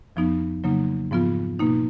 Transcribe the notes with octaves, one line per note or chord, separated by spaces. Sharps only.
F2 F3 B3 D#4
C#3 F#3 A#3 D#4
G#2 F3 B3 F4
B2 A#3 D#4